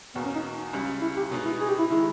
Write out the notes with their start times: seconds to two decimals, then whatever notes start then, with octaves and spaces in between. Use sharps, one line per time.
0.15 E2 B2 A#3 B3
0.25 C#4
0.35 D#4
0.73 C#2 C#3 G3
1.01 E4
1.17 G4
1.31 B2 G#3 B3 D#4
1.45 E4
1.60 G#4
1.69 G4
1.79 E4
1.89 D#3 G#3 E4